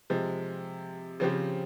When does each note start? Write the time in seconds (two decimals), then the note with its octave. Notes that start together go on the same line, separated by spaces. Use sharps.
0.10 C3 F3 G#3
1.20 C#3 F3 C4 G4